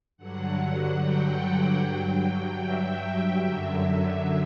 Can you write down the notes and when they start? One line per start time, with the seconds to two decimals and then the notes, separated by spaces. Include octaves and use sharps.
0.17 G2 D3 F#3 F#5
0.98 G5
1.78 G2 F#3
2.59 E5
3.39 F#2 D3 F#3